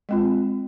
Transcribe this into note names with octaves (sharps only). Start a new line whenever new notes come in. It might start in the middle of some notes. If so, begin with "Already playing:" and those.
G#3 C4 F4